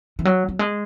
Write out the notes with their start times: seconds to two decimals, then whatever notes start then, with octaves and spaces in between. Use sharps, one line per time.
0.19 E3
0.25 F#3
0.49 F#3
0.59 G#3